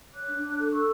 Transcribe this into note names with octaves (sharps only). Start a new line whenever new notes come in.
C#5 D6 F#6
D4
D4
A4
F#6
A4 C#6 E6